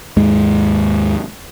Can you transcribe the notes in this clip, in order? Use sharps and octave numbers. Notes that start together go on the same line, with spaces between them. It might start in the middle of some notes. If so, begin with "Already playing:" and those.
D#2 G#2 G#3